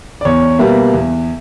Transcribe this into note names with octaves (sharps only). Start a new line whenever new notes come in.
D5
E2 C#5
B2 G3 A#3 E5
E2